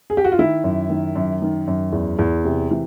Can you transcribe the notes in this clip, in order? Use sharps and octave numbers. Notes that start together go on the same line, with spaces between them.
G#4
G4
F#4
F4
D#3 E4
F#2
D#3
F#2
D#3
F#2
E2
E2
C3
E3